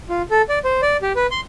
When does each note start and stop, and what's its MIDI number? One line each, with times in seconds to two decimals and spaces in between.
0.09 0.22 65
0.30 0.42 69
0.49 0.59 74
0.64 0.81 72
0.82 0.97 74
1.02 1.13 67
1.16 1.27 71
1.31 1.41 84